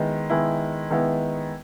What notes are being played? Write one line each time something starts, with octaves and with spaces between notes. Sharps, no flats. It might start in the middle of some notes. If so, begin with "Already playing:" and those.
Already playing: D#3 G#3 B3 E4
D#3 G#3 B3 E4
D#3 G#3 B3 E4